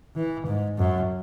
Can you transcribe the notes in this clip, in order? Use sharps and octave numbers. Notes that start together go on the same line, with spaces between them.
E3
G#2
F#2